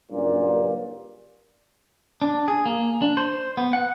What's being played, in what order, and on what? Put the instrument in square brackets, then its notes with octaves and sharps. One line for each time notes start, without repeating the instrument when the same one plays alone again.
[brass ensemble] F#1 G2 A#2
[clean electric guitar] D4
G#4
A#3
D4
C5
B3
F#5